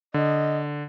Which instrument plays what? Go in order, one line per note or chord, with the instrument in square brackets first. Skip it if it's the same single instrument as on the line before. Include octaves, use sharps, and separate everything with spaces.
[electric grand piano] D3 [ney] D#5